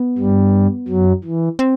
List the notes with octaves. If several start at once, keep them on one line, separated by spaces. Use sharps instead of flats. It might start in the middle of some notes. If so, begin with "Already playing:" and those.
Already playing: B3
G2 G3
F#2 F#3
E3
C4